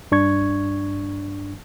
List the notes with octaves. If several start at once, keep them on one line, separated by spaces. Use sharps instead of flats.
G2 D4 C#6 G#6